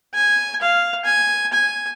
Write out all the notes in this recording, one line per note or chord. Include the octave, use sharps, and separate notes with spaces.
G#5
F5
G#5
G#5